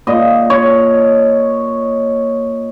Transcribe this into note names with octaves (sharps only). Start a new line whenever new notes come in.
A#2 D#5
C#5